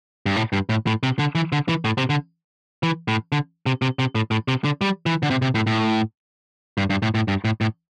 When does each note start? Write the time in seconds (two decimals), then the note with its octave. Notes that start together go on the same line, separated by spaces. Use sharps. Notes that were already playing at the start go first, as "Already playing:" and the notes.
0.26 G2
0.36 A2
0.53 G2
0.69 A2
0.87 A2
1.03 C3
1.19 D3
1.35 E3
1.52 D3
1.68 E3
1.85 A2
1.98 C3
2.10 D3
2.83 E3
3.08 A2
3.32 D3
3.66 C3
3.82 C3
3.99 C3
4.15 A2
4.31 A2
4.48 C3
4.64 D3
4.81 G3
5.06 E3
5.23 D3
5.30 C3
5.42 C3
5.55 A2
5.67 A2
6.78 G2
6.90 G2
7.02 A2
7.15 A2
7.28 G2
7.45 A2
7.61 A2